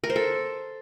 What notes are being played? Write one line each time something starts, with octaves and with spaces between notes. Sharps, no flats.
A#4
C5
A4